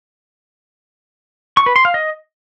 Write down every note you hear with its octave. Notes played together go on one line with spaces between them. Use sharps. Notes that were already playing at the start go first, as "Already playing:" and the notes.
C#6
B4
C6
F5
D#5